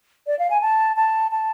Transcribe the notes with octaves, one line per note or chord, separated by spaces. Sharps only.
D5
F5
G#5
A5
A5
A5